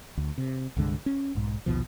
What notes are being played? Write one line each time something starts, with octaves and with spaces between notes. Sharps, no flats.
D2
C3
C2 G2 D3 G#3
C#4
B1 G#2
A#1 D#2 B2 F3